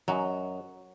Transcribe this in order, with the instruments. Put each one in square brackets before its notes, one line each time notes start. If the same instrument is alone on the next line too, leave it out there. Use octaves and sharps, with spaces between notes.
[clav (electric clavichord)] F#2 D#5 [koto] F#3